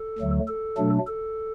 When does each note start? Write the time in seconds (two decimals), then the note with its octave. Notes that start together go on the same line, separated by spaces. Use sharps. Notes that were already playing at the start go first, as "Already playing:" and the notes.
Already playing: A4
0.18 D2 D3 F#3 A3
0.48 A4
0.78 B2 F#3 A3 D4
1.07 A4